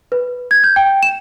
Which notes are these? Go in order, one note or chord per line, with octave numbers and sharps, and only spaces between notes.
B4
G#6
G6
G5
E7